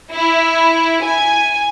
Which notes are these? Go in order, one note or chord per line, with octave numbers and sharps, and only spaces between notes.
E4
G#5